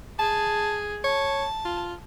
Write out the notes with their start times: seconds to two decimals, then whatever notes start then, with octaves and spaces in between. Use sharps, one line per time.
0.19 G#4 A5
1.04 C#5 A5
1.65 F4